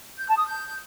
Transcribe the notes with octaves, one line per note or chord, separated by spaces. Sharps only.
G6
A5
D#6
G6